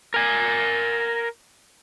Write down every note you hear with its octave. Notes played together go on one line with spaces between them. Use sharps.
A#4 G#5